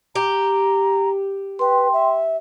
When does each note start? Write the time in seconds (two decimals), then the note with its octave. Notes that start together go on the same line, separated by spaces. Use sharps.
0.15 G4 A#5
1.59 B4 G5 C6
1.93 E5